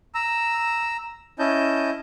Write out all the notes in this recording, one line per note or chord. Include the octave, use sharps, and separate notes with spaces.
A#5 E6
C#4 E4 D#5 A5 G6